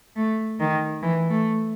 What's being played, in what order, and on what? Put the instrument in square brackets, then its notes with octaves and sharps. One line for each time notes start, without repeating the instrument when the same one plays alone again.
[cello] A3
D#3
E3
A3